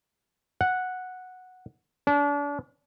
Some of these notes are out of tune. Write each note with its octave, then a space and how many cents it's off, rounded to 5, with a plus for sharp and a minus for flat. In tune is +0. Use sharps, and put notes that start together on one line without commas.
F#5 -5
D4 -35